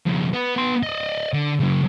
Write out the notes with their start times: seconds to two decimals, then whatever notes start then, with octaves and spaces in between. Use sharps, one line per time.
0.06 F2 C#3
0.33 B3
0.56 B3 C6
0.83 D5 D#5
1.33 D3
1.60 C#3 F#3